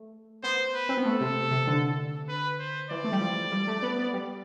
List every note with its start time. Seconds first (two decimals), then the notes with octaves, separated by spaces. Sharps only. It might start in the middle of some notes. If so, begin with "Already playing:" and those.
Already playing: A3
0.43 B3 C5
0.74 B4
0.89 C4
0.97 B3
1.05 A3 A4
1.21 C3
1.51 C3
1.67 D3
2.28 B4
2.59 C5
2.90 E3 D5
3.04 A3
3.12 G3
3.20 F3
3.51 G3
3.67 A3
3.82 B3
3.98 B3
4.13 G3